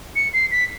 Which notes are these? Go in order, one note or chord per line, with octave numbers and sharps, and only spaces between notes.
C#7
C7
B6